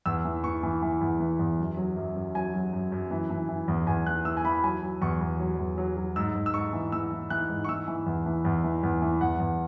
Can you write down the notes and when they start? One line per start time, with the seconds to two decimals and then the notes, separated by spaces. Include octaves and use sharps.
0.06 E2 E6
0.25 E3
0.44 E3 C#6
0.63 E3
0.82 E3
1.01 E2
1.20 E3
1.39 E2
1.59 F#2
1.77 F#3
1.97 F#2
2.16 F#2
2.35 F#3 G#5
2.54 F#3
2.73 F#2
2.92 F#2
3.11 E3
3.30 E3
3.49 E3
3.68 E2
3.87 E2 G#5
4.06 E3 F#6
4.25 E3 E6
4.37 G#5
4.44 E3 B5
4.64 F#3 G#5
4.82 F#3
5.01 E2 C#6
5.21 E2
5.40 F#3
5.59 E2
5.78 F#3
5.97 F#3
6.16 G#2 E6
6.35 G#2
6.46 E6
6.54 G#2 C#6
6.73 E3
6.92 E3 E6
7.12 E3
7.30 E3 F#6
7.49 G#2
7.64 C#6
7.68 E3 E6
7.88 E3
8.06 E2
8.26 E3
8.45 E2
8.64 E3
8.83 E2
9.02 E3
9.21 E2 F#5
9.40 E2